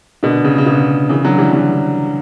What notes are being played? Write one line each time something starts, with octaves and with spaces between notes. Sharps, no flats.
B2 D3
C#3
C#3
B2 D3
C#3 E3
D3 F#3
E3 G3
D3 F#3